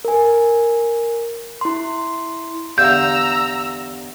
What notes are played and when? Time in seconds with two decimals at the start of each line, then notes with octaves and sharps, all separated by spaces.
0.05 A#4 G#5
1.61 E4 C6
2.78 E2 D3 G4 D5 F5 A#5 E6 G6